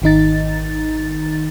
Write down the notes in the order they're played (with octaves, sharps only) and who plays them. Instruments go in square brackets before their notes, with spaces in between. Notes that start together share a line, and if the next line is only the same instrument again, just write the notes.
[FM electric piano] G#1 D#3 D#4 A6